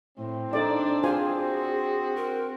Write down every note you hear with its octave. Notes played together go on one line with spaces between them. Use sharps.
A2 C4
D4 D#4 A4 D5
F4 G#4 C5 G#5
F#4
A#4